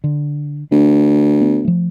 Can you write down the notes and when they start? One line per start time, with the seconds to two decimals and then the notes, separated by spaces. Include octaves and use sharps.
0.04 D3
0.72 D2 D4
1.41 B3
1.65 F3 A3